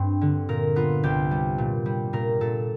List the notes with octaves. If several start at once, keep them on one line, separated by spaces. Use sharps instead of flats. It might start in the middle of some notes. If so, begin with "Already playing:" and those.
Already playing: G2 C4
D3
A#2 A#4
B3 F4
C2 G4
G3
A#2
G3
A#2 A#4
A#2 A4